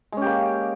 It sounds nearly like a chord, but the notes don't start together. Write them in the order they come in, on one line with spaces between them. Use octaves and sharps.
G#3 C#4 G4 A#3